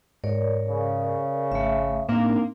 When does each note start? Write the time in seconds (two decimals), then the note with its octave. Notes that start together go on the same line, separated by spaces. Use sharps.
0.24 G#2 A#4 C#5 D5
0.68 C#3
1.52 G#1 A3 E5
2.09 A2 A#3 C4 D4 D#4